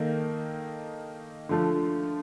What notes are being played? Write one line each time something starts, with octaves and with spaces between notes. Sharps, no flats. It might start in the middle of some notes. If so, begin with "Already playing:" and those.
Already playing: D#3 A#3 D#4 A4
D3 F3 A3